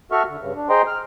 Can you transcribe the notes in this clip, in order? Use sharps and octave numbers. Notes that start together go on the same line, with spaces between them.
F#4 A4 E5 C#6 F6
D3
G2 C#3
D4
G#4 C5 D#5 G5 A#5 C6
F6